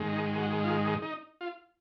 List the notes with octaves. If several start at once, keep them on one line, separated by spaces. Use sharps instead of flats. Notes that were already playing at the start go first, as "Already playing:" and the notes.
Already playing: G#2 D#3 G#3
D#4
F#4
F4
D#4
F4